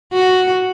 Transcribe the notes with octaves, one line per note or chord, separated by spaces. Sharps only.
F#4